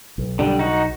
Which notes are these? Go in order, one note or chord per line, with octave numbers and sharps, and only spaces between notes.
B1
D3 G3
D#4 F#4